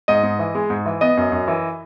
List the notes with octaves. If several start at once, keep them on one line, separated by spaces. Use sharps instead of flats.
G#2 D#5
G#2
E3
G#3
G#2
E3
B3 D#5
F#2
F#2
E3